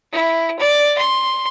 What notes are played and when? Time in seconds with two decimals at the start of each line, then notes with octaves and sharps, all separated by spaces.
0.12 E4
0.59 D5
0.98 C6